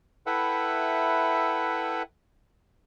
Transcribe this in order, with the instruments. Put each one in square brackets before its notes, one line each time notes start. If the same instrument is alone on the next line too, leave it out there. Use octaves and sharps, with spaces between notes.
[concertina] E4 A4 B4 E5 F#5 G5